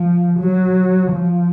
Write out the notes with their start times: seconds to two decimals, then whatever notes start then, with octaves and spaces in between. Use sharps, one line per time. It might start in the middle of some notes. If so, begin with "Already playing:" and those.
Already playing: F3
0.40 F#3
1.12 F3